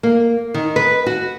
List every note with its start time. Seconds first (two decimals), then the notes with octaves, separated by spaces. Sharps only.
0.03 A#3
0.54 D#3
0.76 B4
1.06 F#4